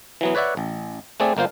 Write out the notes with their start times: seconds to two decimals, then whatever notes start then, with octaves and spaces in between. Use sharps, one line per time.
0.21 E3 F#3 B3
0.35 B4 C#5 D5 E5 F#5
0.57 A1
1.20 A3 C4 G#4 D5
1.37 G1 A#3 F4 C5